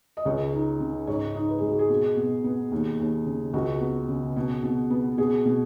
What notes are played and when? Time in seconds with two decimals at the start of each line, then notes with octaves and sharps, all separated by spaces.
0.17 D#5
0.25 C#2 C#5
0.53 D#4
0.80 C#3
1.07 G#2 C#5
1.35 D#4
1.49 B4
1.58 G#3 G#4
1.69 F#4
1.79 G#4
1.90 B2
2.17 B2
2.44 B3
2.71 D#2
3.00 D#2
3.26 C#3
3.53 C#2 F#4
3.81 B3
4.09 C#3
4.36 B2
4.64 B2
4.90 B3
5.18 B2 G#4
5.45 B2